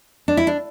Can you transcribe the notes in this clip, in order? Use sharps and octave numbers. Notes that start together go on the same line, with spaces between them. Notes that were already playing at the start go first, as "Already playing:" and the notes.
D4
E4
D4